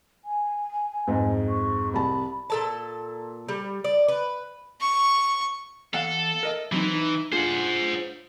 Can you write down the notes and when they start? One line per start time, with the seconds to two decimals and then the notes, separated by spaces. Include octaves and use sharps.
0.25 G#5
1.07 F2 G#2
1.49 C#6
1.94 C2 A5 B5
2.50 A#2 A4 A5
3.49 G3
3.84 D5
4.08 B4
4.80 C#6
5.94 E2 A4 F5 F#5
6.43 A#4 D#5 E5
6.72 E3 F#3 C4 D#4
6.94 D#4
7.32 D4 F4 G#4 C5 F#5